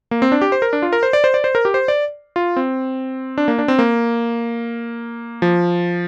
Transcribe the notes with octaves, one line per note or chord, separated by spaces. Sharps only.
A#3
C4
D4
G4
C5
A#4
D4
F4
A#4
C5
D5
C5
D5
C5
A#4
G4
C5
D5
F4
C4
D4
A#3
D4
C4
A#3
F3